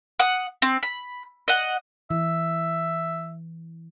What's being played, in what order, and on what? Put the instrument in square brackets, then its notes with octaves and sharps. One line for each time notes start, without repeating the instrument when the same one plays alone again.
[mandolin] F#5 D#6
C4
B5
D#5 F#5
[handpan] E3 [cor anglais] E5